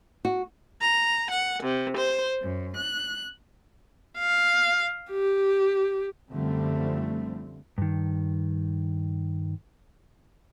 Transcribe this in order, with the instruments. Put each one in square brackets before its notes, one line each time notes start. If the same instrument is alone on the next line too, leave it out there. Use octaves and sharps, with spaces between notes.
[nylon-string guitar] F#4
[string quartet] A#5
F#5
C3
C5
F#2
F#6
[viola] F5
G4
[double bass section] F#2 D3 F3 G3 A3 C4
[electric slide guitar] G2 D#3